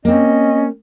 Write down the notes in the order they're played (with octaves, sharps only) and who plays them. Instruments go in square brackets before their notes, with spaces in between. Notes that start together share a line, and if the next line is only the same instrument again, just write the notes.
[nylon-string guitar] A#3 C4 [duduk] C#4 [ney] D#5